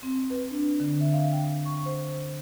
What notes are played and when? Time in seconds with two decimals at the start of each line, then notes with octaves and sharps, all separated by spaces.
0.03 C4
0.30 B4
0.51 D4
0.80 D3
1.00 E5
1.13 F5
1.32 G5
1.65 C#6
1.86 C5